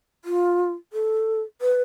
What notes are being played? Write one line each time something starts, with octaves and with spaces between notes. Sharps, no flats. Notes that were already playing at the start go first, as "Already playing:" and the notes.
F4
A4
B4